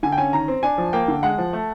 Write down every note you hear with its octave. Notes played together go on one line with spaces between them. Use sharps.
D3 G#5
G5
C#4 G#5
D#3 A#5
C4
D4 G#5
F3
A#3 G5
D3
G#3 F#5
F3
A3